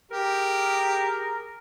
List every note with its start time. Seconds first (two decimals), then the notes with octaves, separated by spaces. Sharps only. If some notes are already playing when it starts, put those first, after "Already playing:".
0.12 G4 G#4 A#4